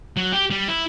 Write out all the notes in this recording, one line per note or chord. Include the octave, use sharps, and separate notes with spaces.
F#3
G4
G3
E4